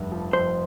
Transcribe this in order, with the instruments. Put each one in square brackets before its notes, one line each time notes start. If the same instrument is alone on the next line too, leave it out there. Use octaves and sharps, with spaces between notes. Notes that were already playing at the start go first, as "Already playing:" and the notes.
Already playing: [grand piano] F1 G2
F3
[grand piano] F2 [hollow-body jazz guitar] C5